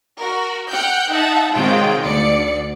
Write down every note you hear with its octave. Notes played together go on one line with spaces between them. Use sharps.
F#4 A#4
F#5 G5 F6 G6
D#4 E5 F#5 A5
C3 D#3 F#3 G#3 F4 G5
D2 D5 C#7